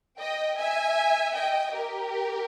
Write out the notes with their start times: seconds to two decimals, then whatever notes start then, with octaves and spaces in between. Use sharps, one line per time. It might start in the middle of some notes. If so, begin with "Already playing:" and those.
0.19 D#5 G5
0.58 E5 G#5
1.35 D#5 G5
1.74 G4 A#4